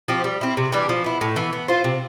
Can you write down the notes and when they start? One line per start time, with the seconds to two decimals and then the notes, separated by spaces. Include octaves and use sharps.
0.08 F3 C4 G4
0.24 G3
0.41 C4 E4
0.57 C3
0.72 E3 G3 D4
0.89 F3
1.04 B3 E4
1.21 A2
1.36 E3 B3
1.53 B3
1.68 F4 C5
1.84 C3